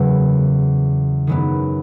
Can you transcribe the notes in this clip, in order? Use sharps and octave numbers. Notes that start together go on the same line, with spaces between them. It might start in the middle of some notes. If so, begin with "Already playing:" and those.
Already playing: E2 C#3 F#3 B3
F#2 D#3 G#3 B3 E4